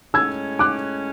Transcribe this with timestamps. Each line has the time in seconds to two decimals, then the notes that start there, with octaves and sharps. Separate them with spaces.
0.14 A2 G#3 C#4 E6 G#6
0.59 D6 F#6